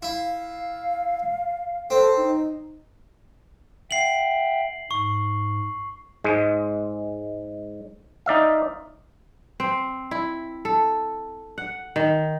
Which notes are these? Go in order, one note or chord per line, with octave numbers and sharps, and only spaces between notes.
E4 F5
C4 A4
D#4
E5 F#5 G5 C7 F#7
G#2 C#6
G#2 G#3
D#4 D5 E5 F5
C4
E4
A4
F#5
D#3